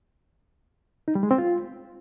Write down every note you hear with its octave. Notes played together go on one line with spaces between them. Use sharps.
D#4
G3
G#3
C4
F4